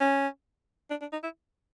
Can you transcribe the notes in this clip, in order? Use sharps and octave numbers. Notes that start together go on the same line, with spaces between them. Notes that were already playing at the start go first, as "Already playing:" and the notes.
C#4
D4
D4
D#4
E4